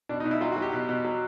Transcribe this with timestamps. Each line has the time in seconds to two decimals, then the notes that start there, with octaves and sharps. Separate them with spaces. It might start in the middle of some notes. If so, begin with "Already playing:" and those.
0.09 B2 D4
0.20 D#4
0.25 B2
0.31 E4
0.41 F#3 F4
0.52 F#4
0.57 F#3
0.62 G4
0.73 B2
0.89 B2
1.04 F#3